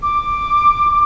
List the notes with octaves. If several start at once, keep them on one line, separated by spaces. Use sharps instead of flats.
D6